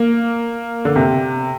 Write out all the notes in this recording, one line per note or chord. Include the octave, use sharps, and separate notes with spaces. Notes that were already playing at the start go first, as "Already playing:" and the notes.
Already playing: A#3
D3
C3